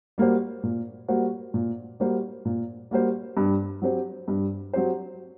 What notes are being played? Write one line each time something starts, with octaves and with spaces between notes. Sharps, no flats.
G3 A#3 F#4 C5
A#2
G3 A#3 F#4 C5
A#2
G3 A#3 F#4 C5
A#2
G3 A#3 F#4 C5
G2
F#3 C4 G4 C5
G2
F#3 C4 G4 C5